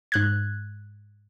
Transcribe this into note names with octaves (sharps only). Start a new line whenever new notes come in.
G#2 F#6 G#6